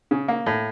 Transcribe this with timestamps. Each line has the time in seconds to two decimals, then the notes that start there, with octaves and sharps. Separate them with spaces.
0.11 C#3
0.28 A#3
0.46 A2